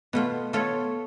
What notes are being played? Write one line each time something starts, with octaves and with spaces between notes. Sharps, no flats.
B2 A3 B3 F4
A3 F4 A4 C#5